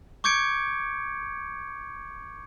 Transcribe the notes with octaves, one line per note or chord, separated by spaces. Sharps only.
C#6 D6 G6 G#6 C#7 D7